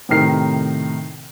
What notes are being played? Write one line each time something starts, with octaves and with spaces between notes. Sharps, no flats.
A2 C3 D#3 A#4 C7